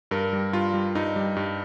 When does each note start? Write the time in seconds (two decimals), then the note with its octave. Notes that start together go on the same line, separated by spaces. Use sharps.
0.11 G2 A#4
0.33 G3
0.53 G2 F4
0.74 G3
0.95 G2 D#4
1.16 G3
1.36 G2